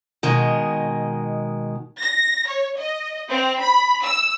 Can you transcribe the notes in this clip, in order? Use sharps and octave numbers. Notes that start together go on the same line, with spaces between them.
B2 D#3 G#3
A#6
C#5
D#5
C4
B5
E6